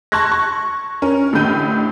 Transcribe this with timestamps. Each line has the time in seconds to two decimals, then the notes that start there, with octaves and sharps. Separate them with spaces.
0.12 A5 C6 C#6 F#6 G#6 A#6
0.32 C#6
1.02 C#4 A#4
1.33 A1 A2 D3 G6 D#7